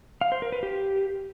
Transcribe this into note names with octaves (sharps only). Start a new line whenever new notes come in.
F5
C5
A#4
B4
G4